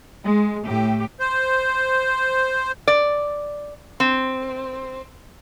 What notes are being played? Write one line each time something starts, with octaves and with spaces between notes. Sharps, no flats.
G#3
A2 G4
C5
D5
C4